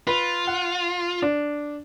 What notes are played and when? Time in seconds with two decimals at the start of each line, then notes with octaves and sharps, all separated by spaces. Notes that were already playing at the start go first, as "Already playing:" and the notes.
0.07 F4 B4
0.47 F#5
1.22 D4